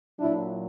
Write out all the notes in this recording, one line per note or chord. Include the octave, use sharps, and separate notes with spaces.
A#2 F#3 D4 E4